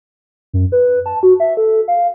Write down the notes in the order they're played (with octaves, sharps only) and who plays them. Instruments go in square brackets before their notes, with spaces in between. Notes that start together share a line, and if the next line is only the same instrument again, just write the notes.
[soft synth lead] F#2
B4
A5
F#4
E5
A4
F5